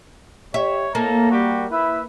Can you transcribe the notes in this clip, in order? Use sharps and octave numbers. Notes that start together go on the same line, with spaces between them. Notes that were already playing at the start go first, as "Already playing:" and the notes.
G4 C#5 E5
A2 A#3 A4 A#5
G3 F#4 G4
E4 B4 E5